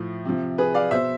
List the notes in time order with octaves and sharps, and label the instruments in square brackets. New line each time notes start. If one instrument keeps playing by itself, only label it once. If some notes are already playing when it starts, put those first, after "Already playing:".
Already playing: [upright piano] A2 F3
C3 F3
G#4 B4
D5 F5
B2 C5 E5